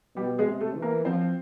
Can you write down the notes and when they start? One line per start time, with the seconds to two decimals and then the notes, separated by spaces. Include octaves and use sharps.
0.16 B2 G3 G4
0.39 G#3 G#4
0.46 C3
0.60 A3 A4
0.76 E3
0.82 A#3 A#4
1.05 F3 C4 C5